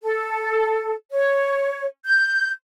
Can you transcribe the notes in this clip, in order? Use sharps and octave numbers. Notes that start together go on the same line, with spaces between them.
A4
C#5
G6